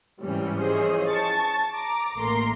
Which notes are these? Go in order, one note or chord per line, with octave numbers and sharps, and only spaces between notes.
G#2 C3 E3 G3 C#4
E3 F3 C#4 G#4 C5 D#5
A5 C#6 A6
A#5 D6
A1 A3 A#3 A#5 C6 C7